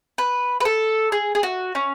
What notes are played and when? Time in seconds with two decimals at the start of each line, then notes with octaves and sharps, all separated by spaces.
0.18 B4
0.60 B4
0.65 A4
1.12 G#4
1.35 G#4
1.43 F#4
1.75 C#4